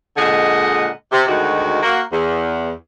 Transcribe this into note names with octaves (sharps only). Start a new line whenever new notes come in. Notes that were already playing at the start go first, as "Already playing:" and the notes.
A#2 D3 G#3 D#5 F#5
C3
D2 D#3 G#3 F#4
A#3 F#4
E2